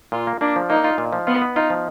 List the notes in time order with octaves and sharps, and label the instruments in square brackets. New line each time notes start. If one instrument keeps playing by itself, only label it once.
[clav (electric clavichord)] A#2 [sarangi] F4
[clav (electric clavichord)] A#3
[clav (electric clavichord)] A#3 [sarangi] D4
[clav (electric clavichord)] F3
[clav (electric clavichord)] A#3 [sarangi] D#4
[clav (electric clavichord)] F4
A#2
F3
[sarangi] B3 [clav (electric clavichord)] F4
[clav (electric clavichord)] B3
[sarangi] D#4 [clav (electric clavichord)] F4
[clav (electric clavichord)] F3